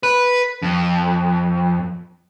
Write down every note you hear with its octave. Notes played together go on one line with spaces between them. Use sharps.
B4
F2